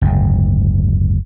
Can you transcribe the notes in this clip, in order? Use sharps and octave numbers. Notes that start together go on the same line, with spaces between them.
F#1 D2 G#2